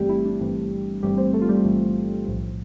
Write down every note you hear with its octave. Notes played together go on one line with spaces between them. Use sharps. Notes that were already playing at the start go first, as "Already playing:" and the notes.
Already playing: G1 G2 E3 G3 A3 C4 G4
E4
D4
G1 G2 E3 A3 C4
G1 G2 E3 G3 A3 C4 G4
C4 C5
A3 A4
F4
G3 G4
G1 G2 E3 A3 C4
B1 A2 F3